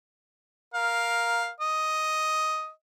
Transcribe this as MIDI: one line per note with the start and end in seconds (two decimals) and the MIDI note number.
0.74 1.49 70
0.74 1.49 77
1.60 2.70 75